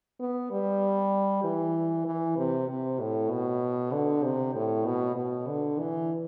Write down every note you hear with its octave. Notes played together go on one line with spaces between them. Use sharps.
B3
G3
E3
E3
C3
C3
A2
B2
D3
C3
A2
B2
B2
D3
E3